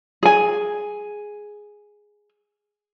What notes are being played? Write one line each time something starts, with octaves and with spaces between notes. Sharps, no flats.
G#4 G#5